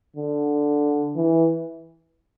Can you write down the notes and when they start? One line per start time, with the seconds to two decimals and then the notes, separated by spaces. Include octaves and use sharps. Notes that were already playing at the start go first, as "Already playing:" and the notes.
0.16 D3
1.16 E3